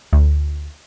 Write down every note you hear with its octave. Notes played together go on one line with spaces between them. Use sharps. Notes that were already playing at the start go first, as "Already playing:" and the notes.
D2